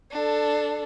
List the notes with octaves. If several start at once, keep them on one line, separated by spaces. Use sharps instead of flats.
D4 A4